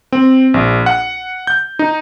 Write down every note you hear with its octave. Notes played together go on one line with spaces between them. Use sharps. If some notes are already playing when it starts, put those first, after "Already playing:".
C4
A#1
F#5
G6
D#4